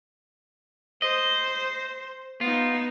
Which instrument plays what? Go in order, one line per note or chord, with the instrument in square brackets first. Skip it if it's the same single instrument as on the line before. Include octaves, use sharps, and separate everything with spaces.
[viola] C5 [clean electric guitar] D#5
[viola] B3 D#4 [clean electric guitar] F4